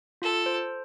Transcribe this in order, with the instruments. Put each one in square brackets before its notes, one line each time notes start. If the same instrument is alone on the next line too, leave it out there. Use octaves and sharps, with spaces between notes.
[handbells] F4 [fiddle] A4
[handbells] C5